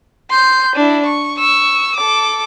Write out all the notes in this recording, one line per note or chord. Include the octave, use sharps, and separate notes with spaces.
C6 G6
D4 E4
C#6
C#6 E6
A4 D6